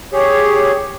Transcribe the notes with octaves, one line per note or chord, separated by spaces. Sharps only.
G4 G#4 C#5